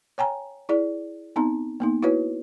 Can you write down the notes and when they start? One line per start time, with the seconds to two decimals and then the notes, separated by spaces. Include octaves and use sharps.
0.18 C#5 G5 G#5 A#5
0.69 E4 G#4 D5
1.36 B3 C4 D#4 A#5
1.80 A#3 B3 D#4
2.02 E4 F#4 B4 C#5